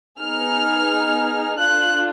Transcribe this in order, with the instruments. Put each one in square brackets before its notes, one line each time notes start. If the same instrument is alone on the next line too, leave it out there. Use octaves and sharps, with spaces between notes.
[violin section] B3 D#4 G#4 F6
D4 F4 A4 F#6